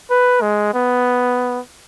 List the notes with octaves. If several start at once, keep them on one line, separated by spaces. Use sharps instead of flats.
B4
G#3
B3